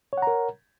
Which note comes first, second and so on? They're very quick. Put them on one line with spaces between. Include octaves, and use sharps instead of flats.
C#5 F#5 A#5 A#4